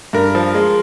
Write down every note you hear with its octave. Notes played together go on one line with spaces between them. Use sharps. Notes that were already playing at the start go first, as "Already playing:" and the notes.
G2 A#4
F3
G#3